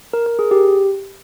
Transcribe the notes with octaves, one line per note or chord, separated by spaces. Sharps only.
A#4
A#4
G#4
G4